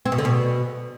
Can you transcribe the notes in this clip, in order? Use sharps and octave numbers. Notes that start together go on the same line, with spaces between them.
C4
B2
D3
B2